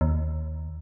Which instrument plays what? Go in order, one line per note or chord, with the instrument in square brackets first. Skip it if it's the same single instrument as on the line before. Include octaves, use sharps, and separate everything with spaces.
[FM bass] D#2